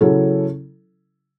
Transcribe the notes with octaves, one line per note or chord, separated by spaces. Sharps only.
C#3 F#3 C#4 E4 A4